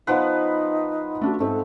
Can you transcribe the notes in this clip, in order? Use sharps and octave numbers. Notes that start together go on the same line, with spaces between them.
F3 B3 D#4 B4 F5 F#5 C6
A3 D4 F#4
G#2 A3 C4 A4